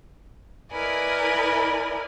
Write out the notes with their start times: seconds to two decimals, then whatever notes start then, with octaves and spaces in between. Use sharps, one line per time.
0.72 E4 A#4 B4 D5 D#5 G#5